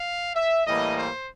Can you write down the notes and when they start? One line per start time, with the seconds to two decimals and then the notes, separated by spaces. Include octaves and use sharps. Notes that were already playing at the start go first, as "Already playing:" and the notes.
Already playing: F5
0.35 E5
0.66 A2 E3 G3 A#3 D#5
0.97 C5